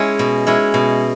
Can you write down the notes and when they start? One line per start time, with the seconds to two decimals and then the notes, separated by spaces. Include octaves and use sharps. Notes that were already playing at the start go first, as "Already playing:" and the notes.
Already playing: G#3 C#4 E4
0.19 B2
0.47 G#3 C#4 E4
0.74 B2